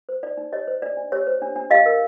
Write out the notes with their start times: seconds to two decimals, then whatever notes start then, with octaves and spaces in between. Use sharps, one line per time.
0.09 C5
0.23 D#4 D5
0.37 D#4
0.52 G4 C#5 D#5
0.68 C5
0.82 D4 D5
0.97 D4
1.12 G4 C#5
1.27 C5
1.42 D4
1.56 D4
1.70 G4 D#5 F5
1.86 A#4